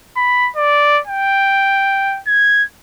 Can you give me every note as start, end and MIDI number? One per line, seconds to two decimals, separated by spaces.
0.17 0.50 83
0.56 1.00 74
1.07 2.20 79
2.27 2.64 92